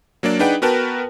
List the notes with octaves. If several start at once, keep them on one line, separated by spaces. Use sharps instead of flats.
F#3 A#3 D4 D5
D4 D#4 G#4 B4 F#5 G5
B3 F#4 A#4 B4 G5 A5